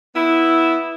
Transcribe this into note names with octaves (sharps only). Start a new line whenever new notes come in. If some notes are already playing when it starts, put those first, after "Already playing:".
B3 E4